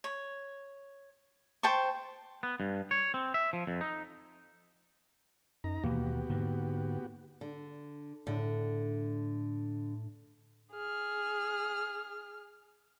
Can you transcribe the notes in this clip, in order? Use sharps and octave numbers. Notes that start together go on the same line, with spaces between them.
C#5
C5 G5 A5 C#6
B3
G2
C#5
C4
E5
F3
F2
D#4
F#2 D#4 A#5
D#2 B2 E3 A#3 B3 F#4 G4
G#2 D3 A#3
D3
A2 D3
G#4 F6